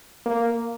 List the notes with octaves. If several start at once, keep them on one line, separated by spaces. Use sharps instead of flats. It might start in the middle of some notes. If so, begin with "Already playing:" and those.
A#3